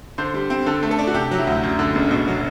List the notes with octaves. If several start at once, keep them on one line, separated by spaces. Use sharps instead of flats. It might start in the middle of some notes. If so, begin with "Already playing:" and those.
D3 C5
G3
C4
D3 A4
A3
A4
D4
F#4
C3 G4
F#3
E4
D2
F#2
D3
F#1
B2
F#3